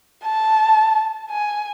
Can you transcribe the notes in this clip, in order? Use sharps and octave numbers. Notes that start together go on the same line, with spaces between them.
A5
G#5